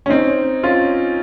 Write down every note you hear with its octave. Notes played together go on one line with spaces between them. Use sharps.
C#4
C4 D#4
C#4 F4